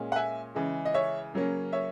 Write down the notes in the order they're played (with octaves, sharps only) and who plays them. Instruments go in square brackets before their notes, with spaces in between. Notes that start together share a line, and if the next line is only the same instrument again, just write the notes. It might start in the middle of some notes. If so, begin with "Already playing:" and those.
Already playing: [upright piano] A#2 G#3 C#4
F#5
E5 G#5
C#3 E3 G#3
D#5
C#5 E5
C#3 F#3 A#3 C#4
C#5 E5